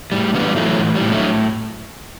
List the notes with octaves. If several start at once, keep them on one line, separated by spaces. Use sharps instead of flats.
A2 G3
E3 G3 B3
E3 F#3 A3
A2
G3
A2
F#3 A3